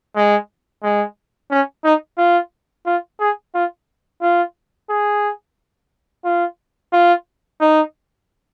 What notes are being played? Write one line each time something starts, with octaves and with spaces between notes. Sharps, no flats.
G#3
G#3
C#4
D#4
F4
F4
G#4
F4
F4
G#4
F4
F4
D#4